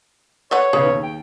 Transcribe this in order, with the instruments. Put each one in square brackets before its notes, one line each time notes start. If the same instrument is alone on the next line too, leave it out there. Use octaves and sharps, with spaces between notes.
[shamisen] A4 B4 F#5 [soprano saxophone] C#5
[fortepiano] B1 C#3 B3 [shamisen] G#4
[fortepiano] D#2
[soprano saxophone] G5